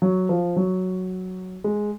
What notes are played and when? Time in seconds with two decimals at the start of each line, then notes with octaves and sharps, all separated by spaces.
0.02 F#3
0.29 F3
0.56 F#3
1.64 G#3